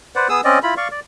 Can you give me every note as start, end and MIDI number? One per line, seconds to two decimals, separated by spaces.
0.16 0.28 71
0.16 0.28 72
0.16 0.28 74
0.16 0.28 78
0.29 0.41 59
0.29 0.41 68
0.29 0.41 87
0.29 0.41 88
0.44 0.59 60
0.44 0.59 61
0.44 0.59 74
0.44 0.59 75
0.63 0.74 64
0.63 0.74 65
0.63 0.74 83
0.77 0.88 74
0.77 0.88 77
0.77 0.88 85
0.91 1.00 74